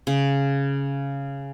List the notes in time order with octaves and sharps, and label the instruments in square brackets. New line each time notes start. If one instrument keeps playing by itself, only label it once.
[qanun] C#3